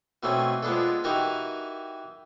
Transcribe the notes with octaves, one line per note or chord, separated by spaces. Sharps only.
B2 E3 A3 C4 C#4
F3 G#3 B3 D4 A4
E3 D#4 F#4 G4 A#4